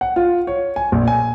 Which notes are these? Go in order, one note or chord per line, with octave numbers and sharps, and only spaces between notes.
F#5
F4
C#5
G#5
A#1
G#5